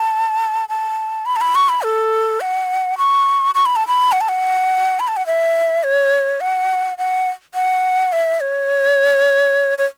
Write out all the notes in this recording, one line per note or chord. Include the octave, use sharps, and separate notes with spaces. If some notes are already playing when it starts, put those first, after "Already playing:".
Already playing: A5
A5
B5
A5
B5
C#6
B5
A4
F#5
C#6
C#6
B5
A5
B5
F#5
A5
F#5
B5
A5
F#5
E5
C#5
F#5
F#5
F#5
E5
C#5
C#5